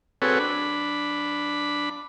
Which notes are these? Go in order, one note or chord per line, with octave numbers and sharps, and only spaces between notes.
C4 F#4 G#4 A4 B4 C#5
D4 B5